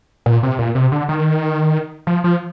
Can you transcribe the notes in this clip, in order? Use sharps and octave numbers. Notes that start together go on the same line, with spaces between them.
A#2
C3
A#2
C3
D3
D#3
F3
F3